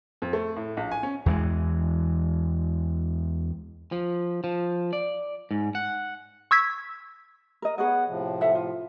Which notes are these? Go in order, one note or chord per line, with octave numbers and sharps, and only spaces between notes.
F2
A3
A2
A#1
G#5
C#4
E2 E3 G3 G#3
F3
F3
D5
G#2
F#5
C#6 E6 G#6 B6
A#4 D#5
B3 G#4 C#5 D#5 F#5
A2 C3 F3
A4 E5 F#5
F4